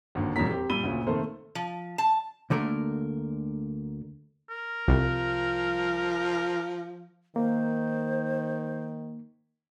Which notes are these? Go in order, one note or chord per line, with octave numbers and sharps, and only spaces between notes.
G#1 D#2 D3
E1 F2 G3 C#4 A#5 B6
C4 G4
A#2 G3 B5 E6 D#7 G7
D2 A#2 C#3
C3 D#3 A3 A#3 A4 C5
F3
A5
D2 D3 A3 A#3 A#4
A#4
C2 F3
D#3 A#3 C5